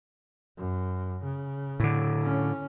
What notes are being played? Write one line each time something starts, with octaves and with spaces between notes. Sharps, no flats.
F#2
C#3
A2 D3
C#4